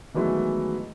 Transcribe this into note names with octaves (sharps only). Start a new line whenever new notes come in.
D#3 E3 F#3 G#3 A3 B3